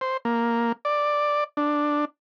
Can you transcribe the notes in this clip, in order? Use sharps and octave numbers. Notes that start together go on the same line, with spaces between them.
C5
A#3
D5
D4